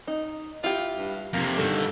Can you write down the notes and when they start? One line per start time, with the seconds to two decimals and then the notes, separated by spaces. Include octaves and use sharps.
0.07 D#4
0.64 E4 F4 G4
0.98 G2
1.33 F2 C3 A#3
1.58 G2 D3 D#3 A4